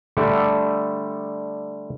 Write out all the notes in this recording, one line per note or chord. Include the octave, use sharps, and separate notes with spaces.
D3 G3 A3 A4 D5